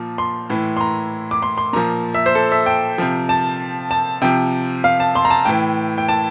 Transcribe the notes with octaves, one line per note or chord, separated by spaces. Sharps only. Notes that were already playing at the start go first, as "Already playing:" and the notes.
Already playing: A#2 F3
C6
A2 E3
C6
A#5
D6
C6
C6
A#2 F3 A#5
E5
C5
A4
E5
G5
C3 F3
A5
A5
C3 F3 G5
F5
A5
C6
A#5
A5
A2 E3 G5
G5
A5